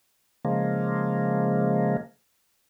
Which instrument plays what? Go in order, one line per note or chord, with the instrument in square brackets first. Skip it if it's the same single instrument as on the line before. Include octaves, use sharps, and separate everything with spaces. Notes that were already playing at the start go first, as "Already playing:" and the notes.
[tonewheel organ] C#3 F3 G#3 A#3